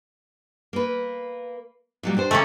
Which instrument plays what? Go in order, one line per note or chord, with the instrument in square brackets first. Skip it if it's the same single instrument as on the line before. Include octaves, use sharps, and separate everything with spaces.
[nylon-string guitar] A#3 B4
A#2 F#3 G3
D4 G4 C5
[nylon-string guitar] C#3 [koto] A3 A#3 C#4